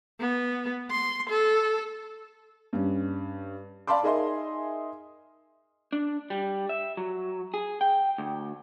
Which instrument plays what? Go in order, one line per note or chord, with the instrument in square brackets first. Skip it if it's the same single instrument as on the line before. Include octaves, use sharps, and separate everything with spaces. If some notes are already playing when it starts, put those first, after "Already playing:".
[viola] B3
C6
A4
[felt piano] G2 C#4
D5 F5 A5 B5 C6 D6
D#4 G#4 A#4 D#5 E5 C6
[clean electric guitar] D4
G3
E5
F#3
G#4
G5
D2